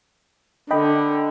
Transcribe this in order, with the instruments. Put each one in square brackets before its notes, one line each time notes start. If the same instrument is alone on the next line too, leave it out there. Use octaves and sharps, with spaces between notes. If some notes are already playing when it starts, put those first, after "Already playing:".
[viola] D3 [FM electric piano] D#5 G5 B5